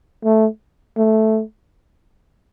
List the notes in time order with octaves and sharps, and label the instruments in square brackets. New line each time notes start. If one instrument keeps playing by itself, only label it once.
[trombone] A3
A3